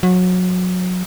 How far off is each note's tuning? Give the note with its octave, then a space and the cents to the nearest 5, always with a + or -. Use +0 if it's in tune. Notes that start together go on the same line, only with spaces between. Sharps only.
F#3 -25